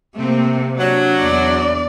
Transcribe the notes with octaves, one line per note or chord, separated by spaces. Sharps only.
C3 A3 A#3 C4
F#3 D4
E2 D5